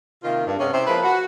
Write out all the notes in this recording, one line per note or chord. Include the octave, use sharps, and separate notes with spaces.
C3 D#3 A#3 F4
G2
C3 G#3 B3 C#4
C3 C#4 E4 C5
F3 G#3 A#3 B4
F#4